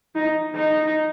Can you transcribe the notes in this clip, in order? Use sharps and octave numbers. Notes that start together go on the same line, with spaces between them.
D#4
D#4